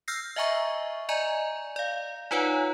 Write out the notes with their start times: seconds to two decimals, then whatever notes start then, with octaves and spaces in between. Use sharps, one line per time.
0.08 E6 F6 G6 A#6 C7
0.36 D#5 E5 G#5 A#5 C#6
1.09 D5 D#5 G#5 A#5
1.76 D5 F5
2.31 D#4 F4 B4 C#5 F#5 G#5